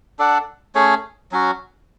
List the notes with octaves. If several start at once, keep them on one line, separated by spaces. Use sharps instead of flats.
D4 A4 D5 F#5
A3 C#4 G#4 C#5
F#3 C#4 F#4